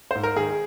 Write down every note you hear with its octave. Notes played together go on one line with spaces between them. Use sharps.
G#2 C5
A#4
D#3 G#4